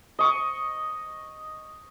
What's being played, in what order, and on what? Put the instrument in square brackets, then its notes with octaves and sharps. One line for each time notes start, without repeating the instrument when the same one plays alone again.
[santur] D#5 C#6